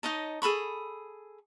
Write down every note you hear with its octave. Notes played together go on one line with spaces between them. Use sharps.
D#4 C#5 D#5 A5
G#4 A4 B5 C#6